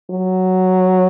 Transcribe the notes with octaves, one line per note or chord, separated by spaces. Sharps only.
F#3